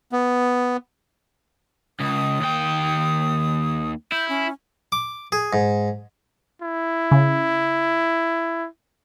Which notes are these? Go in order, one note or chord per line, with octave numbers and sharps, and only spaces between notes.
B3
C#2 D#6
D#2 G5
E4 G6
C#4
D6
G#4
G#2
E4
C#3